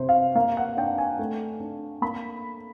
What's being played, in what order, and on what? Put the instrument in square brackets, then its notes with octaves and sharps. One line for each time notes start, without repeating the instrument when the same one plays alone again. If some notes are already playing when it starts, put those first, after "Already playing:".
Already playing: [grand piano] C3 C5
F5
A#3 F5
F#5
D4 G5
G#5
A3
D4
A#3 B5